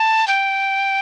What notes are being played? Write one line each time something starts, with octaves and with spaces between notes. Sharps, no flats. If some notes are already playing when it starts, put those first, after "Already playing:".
Already playing: A5
G5